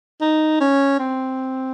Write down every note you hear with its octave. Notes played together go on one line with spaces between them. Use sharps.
D#4
C#4
C4